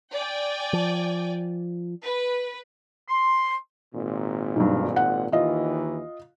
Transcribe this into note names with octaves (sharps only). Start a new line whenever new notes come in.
D5 G5 G#5
F3
B4
C6
G#1 A#2
B1 G2
F#5
D#2 D#3 E3 F4 D#5